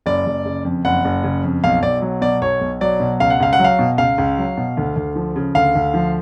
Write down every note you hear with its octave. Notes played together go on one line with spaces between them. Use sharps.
F#1 D5
F#1
C#3
F2
F#1 F#5
F#1
C#3
F2
B1 F5
B1 D5
F#3
B2 D5
B1 C#5
B1
F#3 D5
B2
C#2 F5
F#5
C#2 F5
F#5
F#3
F5
B2
C#2 F5
C#2
F#3
B2
D2
D2
F3
C#3
D2 F5
D2
F3